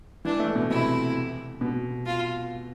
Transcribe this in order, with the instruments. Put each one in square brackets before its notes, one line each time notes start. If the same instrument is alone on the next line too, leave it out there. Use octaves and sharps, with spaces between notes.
[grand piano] E3 [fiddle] D4
[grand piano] A3
B2
[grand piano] C3 [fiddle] E4
[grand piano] B2
[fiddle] F4